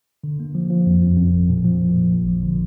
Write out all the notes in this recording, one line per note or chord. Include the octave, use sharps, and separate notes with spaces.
D3
A#3
F3
F3
F2
F2
F2
G1
A#2
F3
A#2
A#2
A1
F3
D3